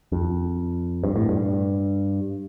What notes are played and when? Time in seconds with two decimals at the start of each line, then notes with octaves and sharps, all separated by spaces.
0.12 F2
1.04 G2
1.16 A2
1.29 G2